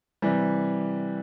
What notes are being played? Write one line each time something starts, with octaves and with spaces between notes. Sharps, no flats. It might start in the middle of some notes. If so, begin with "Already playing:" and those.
C3 E3 G3